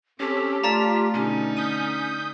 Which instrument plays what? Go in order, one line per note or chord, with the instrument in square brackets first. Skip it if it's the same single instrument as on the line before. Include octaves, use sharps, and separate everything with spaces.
[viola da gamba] C4 [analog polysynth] C#4 A4 [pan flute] G4
[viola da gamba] A3 [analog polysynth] F4 [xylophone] D5 A5 A#5
[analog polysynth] B2 [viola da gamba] D3 D#4 [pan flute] C#4
[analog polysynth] D#6 G6 B6 [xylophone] D#7